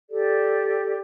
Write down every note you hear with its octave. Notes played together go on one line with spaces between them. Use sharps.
G4 A4 D5